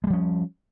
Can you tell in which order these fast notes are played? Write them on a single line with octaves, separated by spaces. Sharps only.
G#3 G3 F3 C#4